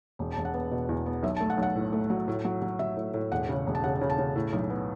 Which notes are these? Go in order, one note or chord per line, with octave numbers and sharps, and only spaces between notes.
E1
A5
E1
F#5
B3
B2
E2
B3
B1 E5
A5
A3
F#5
B1
F#5
A2
A3
F#3
A2
F#3
F#3
F#3 E5
A2
A2
E1 F#5
C#3
E1
A5
C#3 F#5
C#3
A5
C#3
A2
B1
B3